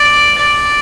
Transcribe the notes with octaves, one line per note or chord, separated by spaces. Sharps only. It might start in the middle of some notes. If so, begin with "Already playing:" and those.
Already playing: D5
D5